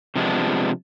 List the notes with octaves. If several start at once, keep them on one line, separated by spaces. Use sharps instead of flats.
C3 F3 G#3 B3 D4